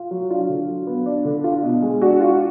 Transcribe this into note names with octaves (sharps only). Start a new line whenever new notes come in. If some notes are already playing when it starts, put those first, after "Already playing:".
Already playing: F4
F#3
D4 F4
D3
F#3
B3
D4
D3
F4
B2
G#3
D4 F#4
F4